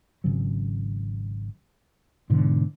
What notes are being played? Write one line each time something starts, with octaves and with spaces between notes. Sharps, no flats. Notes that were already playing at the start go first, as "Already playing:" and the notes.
G#1 C#3 F#3
G#2 B2 D3 E3